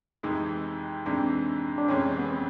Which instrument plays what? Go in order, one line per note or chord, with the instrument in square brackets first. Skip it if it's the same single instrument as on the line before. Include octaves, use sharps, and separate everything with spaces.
[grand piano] F2 C3 E3 G#3 [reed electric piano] D#4
[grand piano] F2 C3 E3 G#3 [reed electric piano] D4
[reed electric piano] D4
[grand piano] F2 C3 E3 G#3 [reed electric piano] C#4
[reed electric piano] B3
C4